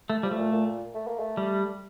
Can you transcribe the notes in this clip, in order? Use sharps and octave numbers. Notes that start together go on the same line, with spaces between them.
A3
F3 G3
A3
A#2
A#2
A3
A#3
A3
G3